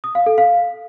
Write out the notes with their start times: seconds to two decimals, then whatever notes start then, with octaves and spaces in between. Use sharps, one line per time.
0.04 D#6
0.15 F5
0.26 A4
0.38 F5